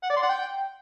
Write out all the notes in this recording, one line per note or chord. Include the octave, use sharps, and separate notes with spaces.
F#5
D5
C6
F#5
G5